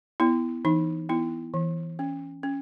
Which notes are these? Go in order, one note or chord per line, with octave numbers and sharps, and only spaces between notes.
B3 E4
E3 D#4
B3 E4
E3
C#4
C#4